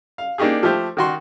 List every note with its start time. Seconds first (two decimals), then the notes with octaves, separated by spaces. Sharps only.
0.18 F5
0.38 A#3 D4 D#4 G4 G#4
0.63 F3 A3 G4 C5
0.97 D#3 F#4 C6